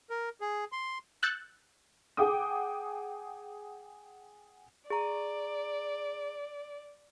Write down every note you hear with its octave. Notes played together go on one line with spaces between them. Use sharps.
A#4
G#4
C6
E6 F#6 G6 A6 C#7
G#4 F#5 G5 D6 D#6
G#4 D5 A#5